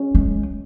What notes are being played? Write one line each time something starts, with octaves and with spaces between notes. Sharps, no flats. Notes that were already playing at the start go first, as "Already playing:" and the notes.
Already playing: C#4
G#3